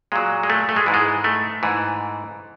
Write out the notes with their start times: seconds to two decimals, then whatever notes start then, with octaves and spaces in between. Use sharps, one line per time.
0.12 A#2 F#3 G#3
0.43 G#3
0.50 A3
0.69 A3
0.76 G#3
0.86 G#2 E3
0.94 G#3
1.24 A3
1.63 G#2 E3